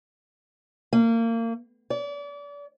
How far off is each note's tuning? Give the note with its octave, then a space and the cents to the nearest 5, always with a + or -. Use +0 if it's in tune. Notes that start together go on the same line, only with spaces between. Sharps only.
A#3 -30
D5 -35